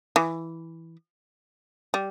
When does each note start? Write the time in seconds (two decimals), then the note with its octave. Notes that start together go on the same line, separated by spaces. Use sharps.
0.16 E3
1.94 G3